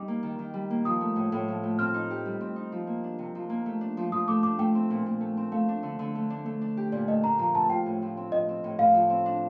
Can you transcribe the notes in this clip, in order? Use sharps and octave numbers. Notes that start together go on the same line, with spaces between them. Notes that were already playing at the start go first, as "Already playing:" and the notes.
Already playing: G3 D#4 D6
A#3
D#3
D#3
G3
A#3
F3 D#6
A3
A2
A2
F3
A3
C4 F6
D#4
G4
G3
C4
D#4
F3
A#3
D4
C3
F3
A#3
A3
D4
F3
F3 D#6
A3 D6
D4 D6
A3 G5
C4
A#2
A#2
A3
C4
A3 F5
D4
D3
D3
A3
D4
A3
D4
G4
A#2 D5
A3 D#5
D4 A#5
F3 A#5
C4 A5
F4 G5
A2
F3
C4
F3 D#5
C4
A2
A2 F5
F3
C4
D4